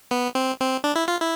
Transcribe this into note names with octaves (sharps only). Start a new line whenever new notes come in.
B3
C4
C4
D4
E4
F4
E4